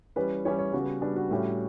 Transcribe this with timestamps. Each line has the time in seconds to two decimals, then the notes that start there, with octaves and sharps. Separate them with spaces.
0.16 E3 G3 C#4 B4
0.45 E3 G3 C#4 C#5
0.59 C#5
0.73 C#3 G3 B3 F#4
1.02 C#3 G3 B3 D4
1.16 F#4
1.31 A2 G3 C#4